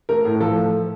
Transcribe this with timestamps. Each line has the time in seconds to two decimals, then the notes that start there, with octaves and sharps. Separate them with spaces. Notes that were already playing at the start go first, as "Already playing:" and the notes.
0.09 A3 A#4
0.25 A2
0.40 F3 A4